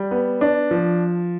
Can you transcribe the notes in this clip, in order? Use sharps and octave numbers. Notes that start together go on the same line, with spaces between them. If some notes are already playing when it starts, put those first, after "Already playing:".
Already playing: G3
B3
D4
F3